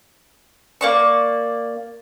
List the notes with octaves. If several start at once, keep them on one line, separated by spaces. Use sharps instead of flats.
A#3 D5 C#6